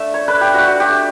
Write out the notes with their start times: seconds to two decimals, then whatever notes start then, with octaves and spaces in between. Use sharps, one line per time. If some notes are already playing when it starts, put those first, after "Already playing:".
Already playing: A3 D4 E5
0.14 C#5
0.28 A3 D4 B4
0.41 G4
0.54 F#4
0.67 F#4
0.80 A3 D4 G4